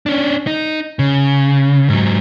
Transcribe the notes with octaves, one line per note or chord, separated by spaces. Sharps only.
C#4 D4
D#4
C#3
G#2 F#3